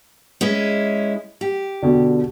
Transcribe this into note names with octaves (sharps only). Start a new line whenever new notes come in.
G#3 C#4 E4
G4
B2 D3